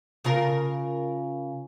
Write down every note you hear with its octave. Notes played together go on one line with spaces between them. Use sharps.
C#3 F4 A#4